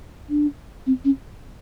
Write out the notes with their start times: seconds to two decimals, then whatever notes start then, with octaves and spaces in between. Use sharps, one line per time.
0.30 D4
0.86 C4
1.04 C#4